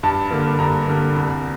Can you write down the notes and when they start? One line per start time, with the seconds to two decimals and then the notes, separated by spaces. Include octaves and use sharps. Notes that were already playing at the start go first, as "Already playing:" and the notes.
0.03 G2 A5
0.31 D3 G3 A#3
0.59 G2 A#5
0.87 D3 G3 A#3
1.15 C2